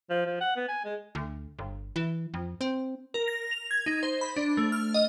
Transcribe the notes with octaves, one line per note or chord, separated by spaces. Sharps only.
F3
F3
F#5
B3
G#5
G#3
D2
G1
E3
F2
C4
A#4
A#6
F7
G#6
D#4
C5
B5
D4
A3
F6
D#5